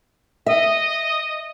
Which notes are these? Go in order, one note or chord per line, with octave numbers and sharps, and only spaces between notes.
D#5 E5